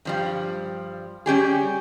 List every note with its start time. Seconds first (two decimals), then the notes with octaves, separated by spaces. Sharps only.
0.05 G2 F3 G3
1.26 G3 C#4 G4 G#4